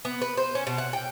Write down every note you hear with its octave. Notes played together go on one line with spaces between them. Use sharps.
B3
B4
C5
C#4
B2
F#5
G5